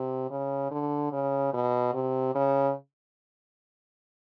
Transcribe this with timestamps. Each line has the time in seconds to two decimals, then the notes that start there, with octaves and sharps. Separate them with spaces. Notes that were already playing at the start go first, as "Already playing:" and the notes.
Already playing: C3
0.30 C#3
0.71 D3
1.12 C#3
1.53 B2
1.94 C3
2.35 C#3